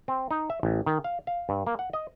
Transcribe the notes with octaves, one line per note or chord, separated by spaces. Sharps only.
C4
D#4
E5
A1
D#3
F5
F5
G2
A#3
F#5
D#5